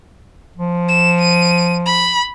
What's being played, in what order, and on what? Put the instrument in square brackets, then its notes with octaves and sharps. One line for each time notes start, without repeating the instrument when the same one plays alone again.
[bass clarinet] F3
[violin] E7
D#7
B5